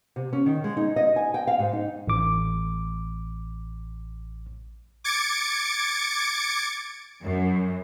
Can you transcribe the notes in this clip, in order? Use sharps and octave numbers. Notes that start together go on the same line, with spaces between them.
C3
C#4
D#3
G#3
D#4
D#5
G#5
G5
F5
G#2
D#4
A1 D6
D6 G#6 A6 C#7 D7
F#2